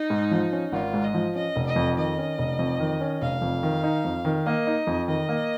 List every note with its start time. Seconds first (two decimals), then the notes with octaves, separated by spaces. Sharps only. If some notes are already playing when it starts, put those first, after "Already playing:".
Already playing: D#4
0.10 G#2
0.31 F3
0.52 C#4
0.72 G#1 F4
0.94 G#2
1.04 D#5
1.14 F3
1.35 C#4 D#5
1.56 F1
1.66 D#5
1.76 F2
1.97 D#3 D#5
2.18 C#4
2.38 F1
2.59 F2
2.80 D#3
3.01 C#4
3.21 F1 F5
3.42 F2
3.63 D#3
3.83 D#4
4.05 F2
4.25 D#3
4.46 A#3 D#5
4.67 D#4
4.87 F2
5.08 D#3 D#5
5.29 A#3